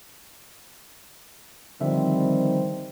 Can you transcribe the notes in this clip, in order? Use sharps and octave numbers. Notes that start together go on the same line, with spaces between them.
D3 D#3 F3 G3 C4 E5